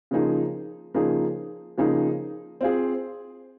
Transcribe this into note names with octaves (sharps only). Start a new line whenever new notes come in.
C#3 F3 A#3 D#4 G#4
C#3 F3 A#3 D#4 G#4
C#3 F3 A#3 D#4 G#4
C4 F4 G#4